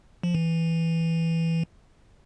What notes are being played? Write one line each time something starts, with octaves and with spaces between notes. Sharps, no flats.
F3
E3